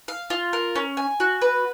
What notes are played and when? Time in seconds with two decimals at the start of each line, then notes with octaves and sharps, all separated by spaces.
0.08 F5
0.30 F4
0.53 A#4
0.76 C#4
0.97 G#5
1.20 F#4
1.41 B4